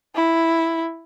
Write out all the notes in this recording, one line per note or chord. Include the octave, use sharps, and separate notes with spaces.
E4